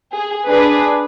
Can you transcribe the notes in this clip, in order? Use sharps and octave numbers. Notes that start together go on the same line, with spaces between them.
G#4
D4 G#4 B4